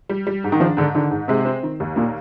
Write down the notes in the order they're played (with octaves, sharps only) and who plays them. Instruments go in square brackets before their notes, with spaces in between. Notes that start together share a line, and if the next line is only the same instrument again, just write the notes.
[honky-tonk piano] G3
G3
G#2
[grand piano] D#3
[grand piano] F3 [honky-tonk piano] D4
[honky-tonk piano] G#2 [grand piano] D3
[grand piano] D3 [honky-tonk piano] D#3
[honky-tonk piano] G#2
[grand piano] C3 [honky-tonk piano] G#3
[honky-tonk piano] C4
D#3
D#2
[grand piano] A#2 [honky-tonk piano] A#3